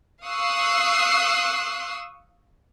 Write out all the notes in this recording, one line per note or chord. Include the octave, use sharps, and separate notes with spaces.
F5 C#6 D#6 E6 F#6 C7